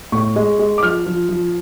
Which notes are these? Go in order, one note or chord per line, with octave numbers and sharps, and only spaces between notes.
A2 C#6
G#3
G#3
D6
F3 F6
F3
F3